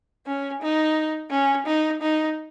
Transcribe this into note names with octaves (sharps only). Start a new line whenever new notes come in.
C#4
D#4
C#4
D#4
D#4